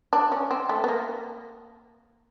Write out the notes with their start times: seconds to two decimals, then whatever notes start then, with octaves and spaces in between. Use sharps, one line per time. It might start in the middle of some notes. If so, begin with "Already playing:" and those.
0.13 D4
0.32 C#4
0.51 C4
0.69 A3
0.84 B3
0.88 A#3